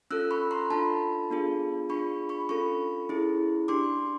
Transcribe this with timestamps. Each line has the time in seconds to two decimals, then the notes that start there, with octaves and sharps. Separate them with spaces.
0.11 C#4 F4 A4 E6 F#6
0.31 B5 C#6
0.51 A#5 C6
0.70 D4 F4 A4 A5 B5
1.30 B3 D4 F4 G#4
1.89 D4 F4 G#4 B5 C#6
2.29 B5 C#6
2.49 C#4 F4 A4 B5 C#6
3.09 C#4 E4 G#4
3.68 D4 G4 C6 D6